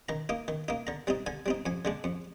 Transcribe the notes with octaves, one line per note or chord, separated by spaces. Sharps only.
D#3 A#5
A#3 D#4
D#3
A#3 D#4
D3 A#5
G3 C4 D#4
D3 G#5
G3 C4 D#4
F2 G#5
D3 G#3 D4
F2